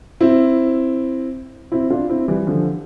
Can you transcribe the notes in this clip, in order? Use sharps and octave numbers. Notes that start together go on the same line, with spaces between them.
C4 E4
C4 E4
D4 F4
C4 E4
E3 G3
D3 F3